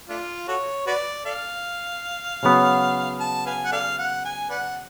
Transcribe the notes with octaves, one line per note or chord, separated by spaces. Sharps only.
A3 D4 F4
F#4 A4 C#5
F#4 B4 D5
A4 D5 F5
C#3 F#3 B3
A5
B4 F5 G#5
F#5
A4 D5 F5
F#5
G#5
B4 D5 F#5